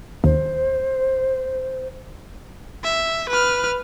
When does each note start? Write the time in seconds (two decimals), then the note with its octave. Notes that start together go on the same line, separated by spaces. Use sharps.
0.24 D#2 C5
2.84 E5
3.29 B4 F6